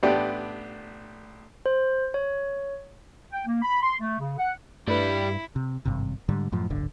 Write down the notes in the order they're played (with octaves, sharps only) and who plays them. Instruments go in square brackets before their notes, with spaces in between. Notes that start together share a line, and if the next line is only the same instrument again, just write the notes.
[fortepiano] A1 B3 D4 G4 D5
[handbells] C5
C#5
[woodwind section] G5
A#3
B5
C6
A3
C#3
F#5
[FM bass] G2 [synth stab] A3 B4 [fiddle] E4 [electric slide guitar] G4 D5
[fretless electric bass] C3
G#1 G2 C3
G#2 D3 G3
F#2 A2 F3
D1 G1 D3